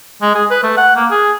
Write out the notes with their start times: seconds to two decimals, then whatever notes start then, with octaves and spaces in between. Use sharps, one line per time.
0.22 G#3
0.35 G#4
0.51 B4
0.63 A3
0.77 F#5
0.96 A#3
1.11 G#4